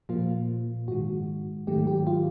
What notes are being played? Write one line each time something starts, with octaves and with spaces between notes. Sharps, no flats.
A#2 F3 A#3 F4
G#2 D#3 G#3 F#4
G#2 D#3 F#3 A3 G4
G4
F4